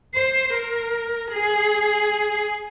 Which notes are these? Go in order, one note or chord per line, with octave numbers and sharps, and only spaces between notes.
C5
A#4
G#4